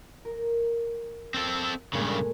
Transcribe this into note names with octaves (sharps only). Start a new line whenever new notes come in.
A#4
C4 A4
G2 A#2 C#3 G#3 A3